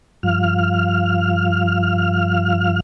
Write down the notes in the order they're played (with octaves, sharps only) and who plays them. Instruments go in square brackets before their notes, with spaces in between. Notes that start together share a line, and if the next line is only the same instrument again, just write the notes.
[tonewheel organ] G2 F3 F5 F6